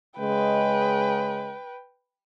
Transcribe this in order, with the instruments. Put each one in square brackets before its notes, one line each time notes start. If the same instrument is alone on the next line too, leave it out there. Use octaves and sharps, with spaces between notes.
[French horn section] C#3 G#3 [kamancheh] B4 G5